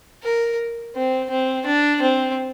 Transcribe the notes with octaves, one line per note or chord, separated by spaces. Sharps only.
A#4
C4
C4
D4
C4